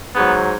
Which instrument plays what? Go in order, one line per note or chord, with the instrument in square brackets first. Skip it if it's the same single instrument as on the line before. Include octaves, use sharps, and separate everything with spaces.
[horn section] G#2 F#3 B3